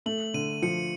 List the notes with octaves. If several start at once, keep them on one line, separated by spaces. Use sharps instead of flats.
A3 F#7
D3 D#7
F3 C#7